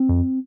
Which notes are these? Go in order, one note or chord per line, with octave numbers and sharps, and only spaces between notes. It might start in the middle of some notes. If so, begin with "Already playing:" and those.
Already playing: C4
F2